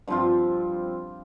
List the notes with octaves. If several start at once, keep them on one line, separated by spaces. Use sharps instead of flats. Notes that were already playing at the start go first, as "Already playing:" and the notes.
G2 F3 C4 F4